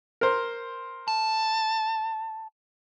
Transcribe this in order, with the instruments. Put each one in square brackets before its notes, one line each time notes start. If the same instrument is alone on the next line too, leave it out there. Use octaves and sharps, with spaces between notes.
[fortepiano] A#4 C5
[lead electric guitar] A5